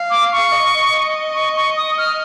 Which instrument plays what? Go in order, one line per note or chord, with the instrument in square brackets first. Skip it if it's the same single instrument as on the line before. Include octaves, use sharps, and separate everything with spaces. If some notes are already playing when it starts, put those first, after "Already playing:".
Already playing: [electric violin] F5
[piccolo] D6
C#6
[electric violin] D#5
[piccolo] C#6
C#6
D#6
F6